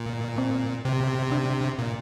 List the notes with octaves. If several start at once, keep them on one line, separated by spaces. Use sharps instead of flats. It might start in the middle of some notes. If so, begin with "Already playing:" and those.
Already playing: A#2
C4
C3
D4
A#2